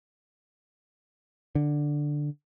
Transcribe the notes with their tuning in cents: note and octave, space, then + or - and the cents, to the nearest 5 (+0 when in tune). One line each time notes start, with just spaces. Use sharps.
D3 +5